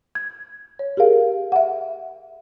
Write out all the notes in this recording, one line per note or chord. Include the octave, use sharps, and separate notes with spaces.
G#6
C#5
G4 G#4 A#4 F5
E5 F#5